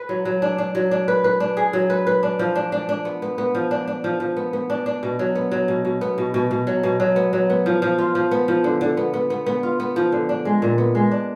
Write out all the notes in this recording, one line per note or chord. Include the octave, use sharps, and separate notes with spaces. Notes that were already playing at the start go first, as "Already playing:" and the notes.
Already playing: B4
F#3
F#3
D4
D4
F#3
D4
B4
B4
D4
G#4
F#3
B4
B4
D4
F3
D4
D4
D4
B3
B3
B3
F3
D4
D4
F3
F3
B3
B3
D4
D4
B2
F#3
B3
F#3
B2
B2
B3
B2
B2
B2
F#3
B2
F#3
B3
F#3
B3
F3
F3
F4
F3
B3
F3
D3
D3
B3
B3
B3
B3
F4
B3
F3
D3
D4
G#3
A#2
B3
G#3
D4